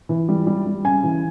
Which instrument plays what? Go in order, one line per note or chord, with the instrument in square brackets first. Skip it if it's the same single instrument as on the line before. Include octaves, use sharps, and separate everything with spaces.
[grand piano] E3
G3
G3
G3
C#3 G#5
E3